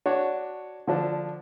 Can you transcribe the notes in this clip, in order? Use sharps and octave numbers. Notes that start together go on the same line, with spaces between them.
D4 F#4 C#5
D3 F3 D4